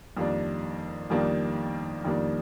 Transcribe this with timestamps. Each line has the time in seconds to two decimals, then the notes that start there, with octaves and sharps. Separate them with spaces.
0.17 F2 D#3 G3 A#3 D4
1.10 F2 D#3 G3 A#3 D4
2.04 F2 D#3 G3 A#3 D4